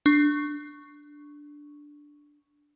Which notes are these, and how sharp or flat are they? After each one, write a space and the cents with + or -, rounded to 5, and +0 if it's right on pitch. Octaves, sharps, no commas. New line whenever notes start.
D4 +0 C#6 +0